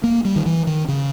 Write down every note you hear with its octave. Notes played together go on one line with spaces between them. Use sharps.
A#3
G3
D#3
E3
D#3
C#3